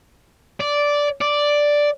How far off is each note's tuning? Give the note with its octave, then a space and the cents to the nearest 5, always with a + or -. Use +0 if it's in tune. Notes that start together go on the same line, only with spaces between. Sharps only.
D5 -10
D5 +0